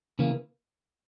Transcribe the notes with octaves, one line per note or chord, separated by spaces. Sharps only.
C#3 E3 A#3